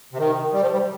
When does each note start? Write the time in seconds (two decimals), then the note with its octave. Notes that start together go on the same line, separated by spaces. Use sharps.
0.13 C3
0.18 D#3
0.53 G3
0.62 F3
0.73 G3